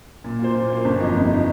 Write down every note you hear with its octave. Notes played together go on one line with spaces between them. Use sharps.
A#2
A#3 F4 C5
A#2
A#3 F4 C5
G1
F2 F3 D#4
G1
F3 D#4